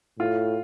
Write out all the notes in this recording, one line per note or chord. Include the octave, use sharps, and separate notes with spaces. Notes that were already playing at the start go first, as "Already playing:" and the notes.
A2 F4